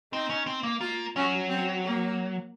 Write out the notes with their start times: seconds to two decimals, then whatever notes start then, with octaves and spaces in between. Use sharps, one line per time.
0.12 C4 D#4
0.30 C#4
0.46 C4
0.63 A#3
0.81 A#3 F4
1.16 F#3 C#4
1.49 C4
1.84 A#3